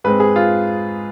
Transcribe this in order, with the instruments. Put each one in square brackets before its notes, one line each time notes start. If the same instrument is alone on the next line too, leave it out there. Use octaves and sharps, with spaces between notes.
[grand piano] G#2 G#3 C4 B4
G#4
F4